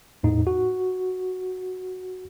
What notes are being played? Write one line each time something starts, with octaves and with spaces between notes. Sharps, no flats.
E2 A2 D#4
F#4